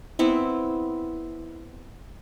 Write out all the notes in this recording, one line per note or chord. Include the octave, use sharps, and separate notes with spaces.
B3 C4 E4